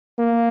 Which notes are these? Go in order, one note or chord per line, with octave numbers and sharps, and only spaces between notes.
A#3